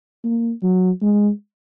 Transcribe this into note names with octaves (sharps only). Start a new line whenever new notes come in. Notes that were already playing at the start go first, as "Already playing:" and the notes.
A#3
F#3
G#3